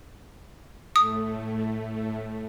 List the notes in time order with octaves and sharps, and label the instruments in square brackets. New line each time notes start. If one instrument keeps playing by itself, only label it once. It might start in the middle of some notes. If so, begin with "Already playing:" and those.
[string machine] A2 A3 [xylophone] D#6